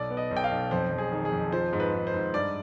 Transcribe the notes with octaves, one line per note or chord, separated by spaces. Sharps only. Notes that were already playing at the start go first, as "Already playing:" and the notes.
Already playing: B1 D5
B3
D#5
B1
G5
F5
B1
F2 C5
F2
G#4
D#3
G#4
F2
F3 C5
G#2
B4
G#2
C5
G#2
G2 D5